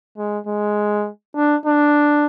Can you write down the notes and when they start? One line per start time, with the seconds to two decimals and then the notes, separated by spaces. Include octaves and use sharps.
0.18 G#3
0.47 G#3
1.36 D4
1.66 D4